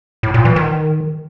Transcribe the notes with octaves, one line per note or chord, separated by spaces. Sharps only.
A2
A#2
E3
D#3